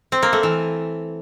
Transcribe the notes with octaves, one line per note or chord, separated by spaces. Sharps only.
C4
A#3
A3
E3